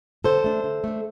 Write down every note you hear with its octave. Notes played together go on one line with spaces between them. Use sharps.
D3 A4 C5
A3 D4
D3
A3 D4